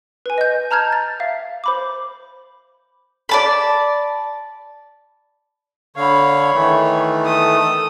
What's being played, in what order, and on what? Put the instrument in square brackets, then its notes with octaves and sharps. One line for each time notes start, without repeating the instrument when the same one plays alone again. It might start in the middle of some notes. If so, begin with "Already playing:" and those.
[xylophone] B4 G#5
D#5 G6
A5 A#5 F6 G6 G#6
A6
E5 F5
C5 B5 D6
[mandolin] D5 A5 B5
[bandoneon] D3 F5 [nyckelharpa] C#5 B5
[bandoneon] D#3 E3 A3
[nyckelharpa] A4 D#6